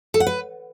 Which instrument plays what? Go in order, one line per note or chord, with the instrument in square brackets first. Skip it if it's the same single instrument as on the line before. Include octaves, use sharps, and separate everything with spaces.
[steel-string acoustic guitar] A4
F#5
B4